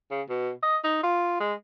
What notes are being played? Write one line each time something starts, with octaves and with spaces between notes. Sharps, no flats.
C#3
B2
D#5
D#4
F4
G#3